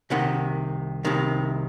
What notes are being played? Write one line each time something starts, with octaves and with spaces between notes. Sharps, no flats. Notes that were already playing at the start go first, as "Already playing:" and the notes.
C2 C3 D#3 F#5
C2 C3 D#3